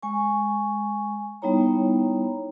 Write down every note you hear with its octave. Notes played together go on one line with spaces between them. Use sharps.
G#3 G#5 C#6
G3 B3 D#4 E4 C#5 A#5